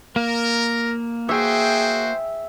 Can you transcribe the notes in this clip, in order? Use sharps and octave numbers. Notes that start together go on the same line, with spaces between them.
A#3 A#4
F#4 G#4 C5 E5 G5